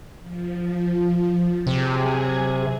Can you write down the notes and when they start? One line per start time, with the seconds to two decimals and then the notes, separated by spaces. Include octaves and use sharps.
0.20 F3
1.67 C3 F#3 G#4 G#5